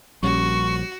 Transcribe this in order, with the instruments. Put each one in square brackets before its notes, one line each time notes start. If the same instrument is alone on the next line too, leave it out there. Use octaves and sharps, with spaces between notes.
[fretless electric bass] A#1 [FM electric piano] G3 C#4 [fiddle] F#4 [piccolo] C#6